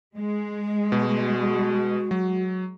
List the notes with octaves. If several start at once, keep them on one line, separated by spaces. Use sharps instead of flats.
G#3
B2 F#4
F#3